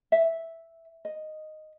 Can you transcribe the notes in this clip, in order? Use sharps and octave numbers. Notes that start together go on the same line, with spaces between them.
E5
D#5